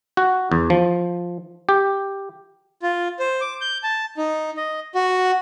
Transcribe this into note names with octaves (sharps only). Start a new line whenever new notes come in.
F#4
E2
F3
G4
F4
C5
D6
G6
A5
D#4
D#5
F#4